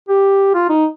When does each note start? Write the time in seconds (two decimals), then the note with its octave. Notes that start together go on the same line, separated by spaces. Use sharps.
0.09 G4
0.54 F4
0.69 D#4